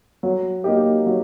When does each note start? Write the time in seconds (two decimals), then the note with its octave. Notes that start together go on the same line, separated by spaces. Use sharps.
0.23 F#3
0.64 A#3 D#4 G4
1.06 F#3